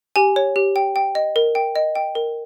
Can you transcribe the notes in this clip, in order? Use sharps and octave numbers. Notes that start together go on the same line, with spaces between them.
G4 G#5
C#5
G4
G5
G5
D#5
A#4
G5
D#5
G5
A#4